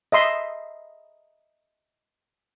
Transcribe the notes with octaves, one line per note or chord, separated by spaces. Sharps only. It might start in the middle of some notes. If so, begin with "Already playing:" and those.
D#5 E5 C6